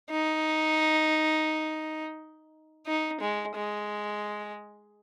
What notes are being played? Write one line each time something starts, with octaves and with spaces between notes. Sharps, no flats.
D#4
D#4
G#3
G#3